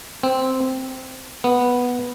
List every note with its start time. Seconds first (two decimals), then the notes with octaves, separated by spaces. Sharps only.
0.23 C4
1.44 B3